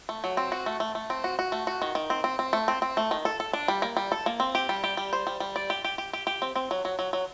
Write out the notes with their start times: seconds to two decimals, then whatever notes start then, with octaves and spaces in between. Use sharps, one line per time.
0.09 A3
0.24 F#3
0.37 C4
0.52 F#4
0.66 A3
0.80 A3
0.95 A3
1.10 C4
1.24 F#4
1.39 F#4
1.52 A3
1.67 F#4
1.82 D#3
1.95 D#3
2.10 C4
2.24 C4
2.39 C4
2.53 A3
2.68 C4
2.82 C4
2.97 A3
3.11 D#3
3.25 A4
3.40 A4
3.53 D4
3.68 G3
3.82 A#3
3.97 G3
4.12 A4
4.26 A#3
4.40 C4
4.55 G4
4.69 G3
4.84 G4
4.97 G3
5.13 C5
5.27 G3
5.40 G3
5.56 D5
5.70 G4
5.84 G4
5.98 G4
6.13 G4
6.27 G4
6.42 C4
6.56 C4
6.71 F#3
6.85 F#3
6.99 F#3
7.13 F#3